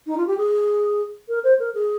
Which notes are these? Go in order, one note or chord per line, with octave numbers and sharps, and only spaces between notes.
D#4
F4
G4
G#4
A#4
C5
A#4
G#4